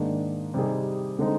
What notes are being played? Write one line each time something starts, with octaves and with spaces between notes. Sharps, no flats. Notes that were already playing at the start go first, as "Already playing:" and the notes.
Already playing: G#2 D#3 A#3 D4 G#4
C3 G3 C4 D#4 G#4
D3 G#3 C4 D#4